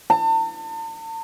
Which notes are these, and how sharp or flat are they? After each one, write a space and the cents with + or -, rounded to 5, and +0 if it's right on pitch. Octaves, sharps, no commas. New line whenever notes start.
A5 +40